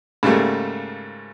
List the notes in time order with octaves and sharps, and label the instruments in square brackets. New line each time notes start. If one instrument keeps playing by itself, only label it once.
[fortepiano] G#2 C#3 G3 A3 A#3